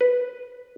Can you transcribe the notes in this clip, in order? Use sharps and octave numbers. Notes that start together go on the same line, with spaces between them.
B4